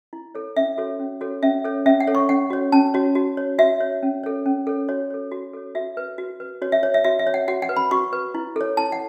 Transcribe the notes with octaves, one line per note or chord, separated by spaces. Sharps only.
E4
A4 C#5
C#4 E5
F#4 A4 C#5
C#4
F#4 A4 C#5
C#4 E5
A4 C#5
C#4 E5
F#5
A4 C#5
C#6
C#4 F#5
F#4 C#5
C#4 A5
F#4 C#5
F#4
C#5
F#4 E5
C#5
C#4
A4 C#5
C#4
A4 C#5
F#4 C#5
A4 C#5
F#4
A4 C#5
F#4 E5
B4
F#4
B4
F#4 C#5
E5
C#5
E5
F#4 E5
E5
C#5
F#5
F#4 F#5
F#5
B4
B5
F#4 C#6
B4
E4
A4 C#5
E4 A5
F#5